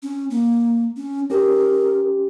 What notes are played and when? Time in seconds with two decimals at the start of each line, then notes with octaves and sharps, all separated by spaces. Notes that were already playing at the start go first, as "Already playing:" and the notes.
0.03 C#4
0.30 A#3
0.96 C#4
1.30 C#4 G4 A#4